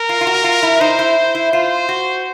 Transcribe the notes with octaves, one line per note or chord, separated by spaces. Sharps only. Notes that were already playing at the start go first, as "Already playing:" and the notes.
Already playing: A#4
F4
F4
F#4
F4
E4
D#4 C5
E4
E4
F4 C5
F#4